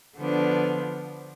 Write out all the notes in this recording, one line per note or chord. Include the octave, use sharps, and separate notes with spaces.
D3 F3 B3 D4